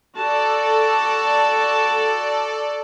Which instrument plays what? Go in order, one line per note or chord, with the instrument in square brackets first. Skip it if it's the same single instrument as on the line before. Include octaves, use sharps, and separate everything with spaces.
[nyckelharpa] F#4 A5 [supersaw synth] A4 D5